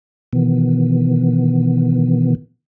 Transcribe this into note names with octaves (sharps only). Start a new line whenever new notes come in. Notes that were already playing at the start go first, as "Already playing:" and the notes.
B2 D#3 E3 B3